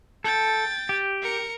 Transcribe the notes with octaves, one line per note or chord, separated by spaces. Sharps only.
A4 G5 A6
G4
A#4 C#7